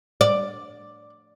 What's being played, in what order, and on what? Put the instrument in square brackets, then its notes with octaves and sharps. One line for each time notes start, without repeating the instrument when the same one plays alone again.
[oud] D5